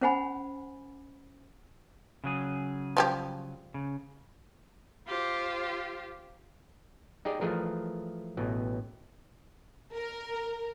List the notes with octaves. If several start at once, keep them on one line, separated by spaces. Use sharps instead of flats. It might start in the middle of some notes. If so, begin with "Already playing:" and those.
C#4 C5 F#5 G#5 B5
C#3 F#3 G#4
F3 G3 G4
C#3
F4 G4 C5
D#4 G4 G#4 D5
E3 F3 A3 G#4 A#4
A1 B2 E3
A#4